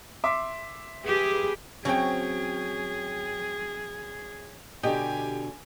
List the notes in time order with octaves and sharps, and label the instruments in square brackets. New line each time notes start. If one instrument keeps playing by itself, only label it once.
[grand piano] E5 C6 D6
[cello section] G4 G#4 B4
[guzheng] F#3 C4 F#4 [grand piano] C#4 G5 [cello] G#4
[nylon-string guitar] B2 D3 D4 [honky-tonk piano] G4 [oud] D#5 [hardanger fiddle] G#5